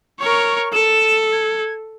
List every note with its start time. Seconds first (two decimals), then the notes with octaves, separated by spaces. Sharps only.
0.20 A#4 C#5 C#6
0.73 A4 E7
1.32 G#6